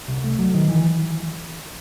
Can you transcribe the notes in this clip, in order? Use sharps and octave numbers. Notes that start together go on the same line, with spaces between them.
C2
A3
F#3
D#3
E3